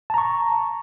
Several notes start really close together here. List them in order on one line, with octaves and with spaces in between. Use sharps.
A5 A#5 C#6